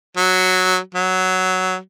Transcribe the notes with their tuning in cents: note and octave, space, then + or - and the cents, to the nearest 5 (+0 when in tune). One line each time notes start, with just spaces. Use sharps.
F#3 -5
F#3 +5